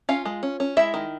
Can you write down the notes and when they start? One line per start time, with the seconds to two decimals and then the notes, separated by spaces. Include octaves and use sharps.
0.09 C#4 F4 F5
0.25 G#3
0.43 C#4
0.60 C#4
0.77 G#3 E4 E5
0.94 D#3